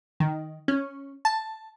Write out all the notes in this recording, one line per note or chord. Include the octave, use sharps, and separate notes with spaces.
D#3
C#4
A5